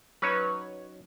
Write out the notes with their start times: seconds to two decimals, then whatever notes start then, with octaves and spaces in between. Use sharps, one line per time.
0.22 F#3 C#4 D#4 B4 C#5